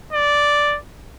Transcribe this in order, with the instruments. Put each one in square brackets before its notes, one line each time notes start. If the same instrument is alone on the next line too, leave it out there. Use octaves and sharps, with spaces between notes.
[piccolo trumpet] D5